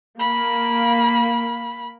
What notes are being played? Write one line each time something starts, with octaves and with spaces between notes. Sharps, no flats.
A#3 B5